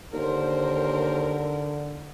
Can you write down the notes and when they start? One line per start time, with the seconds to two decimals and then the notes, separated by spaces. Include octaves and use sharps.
0.13 D#2 D3 A#4 C5